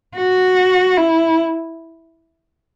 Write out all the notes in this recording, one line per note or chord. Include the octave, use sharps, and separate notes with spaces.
F#4
E4